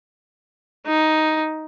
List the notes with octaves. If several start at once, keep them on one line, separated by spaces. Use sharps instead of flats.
D#4